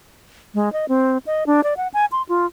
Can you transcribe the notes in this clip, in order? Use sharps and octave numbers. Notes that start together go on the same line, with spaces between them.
G#3
D#5
C4
D#5
D4
D5
F#5
G#5
C6
F4